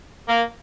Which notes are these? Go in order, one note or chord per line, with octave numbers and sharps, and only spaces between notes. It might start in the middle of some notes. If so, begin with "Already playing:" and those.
A#3